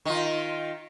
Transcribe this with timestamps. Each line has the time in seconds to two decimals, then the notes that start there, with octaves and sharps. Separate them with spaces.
0.05 D#3 F4